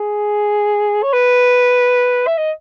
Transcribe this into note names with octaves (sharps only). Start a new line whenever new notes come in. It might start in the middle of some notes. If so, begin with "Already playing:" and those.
Already playing: G#4
C#5
B4
E5
D#5